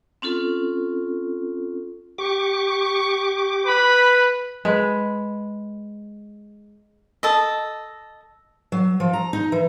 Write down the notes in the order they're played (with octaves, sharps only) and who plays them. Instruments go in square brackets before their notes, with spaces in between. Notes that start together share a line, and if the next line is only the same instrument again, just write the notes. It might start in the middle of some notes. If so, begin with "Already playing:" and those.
[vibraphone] C4 C#4 F4 A4
[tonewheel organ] G4 D6 [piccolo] C#6
[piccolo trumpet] B4 [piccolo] B5
[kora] G#3 B4
[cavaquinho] A4 D#5
[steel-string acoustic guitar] F#3
F3
A#5
D#4
E3